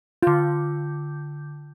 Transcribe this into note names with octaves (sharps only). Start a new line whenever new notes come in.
D3 F4 G6